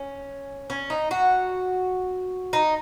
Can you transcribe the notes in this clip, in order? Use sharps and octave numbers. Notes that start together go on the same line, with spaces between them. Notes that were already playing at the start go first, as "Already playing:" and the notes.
Already playing: C#4
C#4
D#4
F#4
D#4